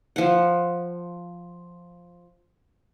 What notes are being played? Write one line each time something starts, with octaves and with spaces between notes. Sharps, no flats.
F3 F#5